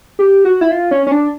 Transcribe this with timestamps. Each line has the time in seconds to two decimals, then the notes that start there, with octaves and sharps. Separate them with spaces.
0.19 G4
0.45 F#4
0.61 E4
0.71 F4
0.91 C#4
1.07 C#4
1.11 D4